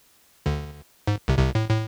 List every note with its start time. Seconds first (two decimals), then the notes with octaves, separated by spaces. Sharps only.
0.46 D2 D3
1.07 G#2
1.28 C2 C3
1.39 C2 C3
1.55 A2
1.70 A2